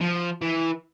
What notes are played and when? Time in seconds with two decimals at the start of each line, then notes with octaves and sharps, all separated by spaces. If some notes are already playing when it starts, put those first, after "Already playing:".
0.01 F3
0.42 E3